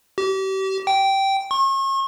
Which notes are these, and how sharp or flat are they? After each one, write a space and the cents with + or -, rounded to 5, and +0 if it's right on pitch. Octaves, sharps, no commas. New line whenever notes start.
G4 -35
G5 -10
C#6 -40